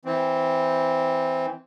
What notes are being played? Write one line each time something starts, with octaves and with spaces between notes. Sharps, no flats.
E3 C4